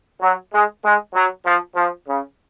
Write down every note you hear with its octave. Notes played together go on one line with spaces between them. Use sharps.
F#3
G#3
G#3
F#3
F3
F3
C#3